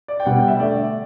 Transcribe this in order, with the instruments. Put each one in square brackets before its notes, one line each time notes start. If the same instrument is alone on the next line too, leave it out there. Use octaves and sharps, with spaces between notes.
[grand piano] D5
G5
B2 G3 B3 F#5
G5
E5
D3 A3 D5